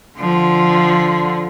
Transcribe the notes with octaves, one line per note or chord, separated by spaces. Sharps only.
D3 F3